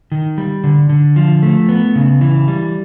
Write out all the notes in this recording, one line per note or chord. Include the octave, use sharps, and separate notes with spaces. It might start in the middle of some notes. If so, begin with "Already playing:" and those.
D#3
G3
D3
D3
F3
A3
B3
C#3
E3
G3